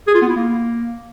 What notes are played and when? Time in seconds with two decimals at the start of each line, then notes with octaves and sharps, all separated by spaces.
0.07 G#4
0.15 F4
0.22 B3
0.29 E4
0.36 A#3